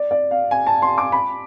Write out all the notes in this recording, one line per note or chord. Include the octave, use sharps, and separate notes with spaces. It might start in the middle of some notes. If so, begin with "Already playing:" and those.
Already playing: D5
D5
F5
G#5
A5
C6
D6
B5